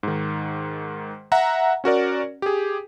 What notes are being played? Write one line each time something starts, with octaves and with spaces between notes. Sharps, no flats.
G#2 D#3
E5 F#5 A#5
C#4 F#4 A#4 D5
G4 G#4